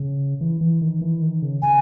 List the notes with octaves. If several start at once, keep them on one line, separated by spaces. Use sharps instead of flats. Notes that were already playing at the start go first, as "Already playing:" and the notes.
Already playing: C#3
E3
E3
D#3
E3
D#3
C#3
C#3 G#5